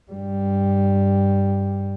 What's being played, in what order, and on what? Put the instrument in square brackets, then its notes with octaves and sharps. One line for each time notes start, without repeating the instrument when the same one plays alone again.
[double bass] G2 G3